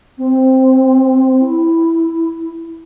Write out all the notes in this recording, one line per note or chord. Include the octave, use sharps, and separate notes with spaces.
C4
E4